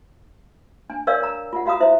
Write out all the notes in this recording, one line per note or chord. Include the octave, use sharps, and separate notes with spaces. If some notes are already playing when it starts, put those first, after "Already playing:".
D4 G#5
A#4 C#5 D5 F5 E6
A#4 A#5
F4 F#5
F4 F#4 F5 A#5 D#6
E4 C5 E5